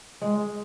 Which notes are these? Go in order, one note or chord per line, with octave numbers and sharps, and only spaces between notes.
G#3